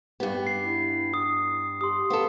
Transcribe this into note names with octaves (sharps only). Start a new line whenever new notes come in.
G2 B3 G4
C7
E4
D#6 C7
G4 C6 D#6
B3 A4 F5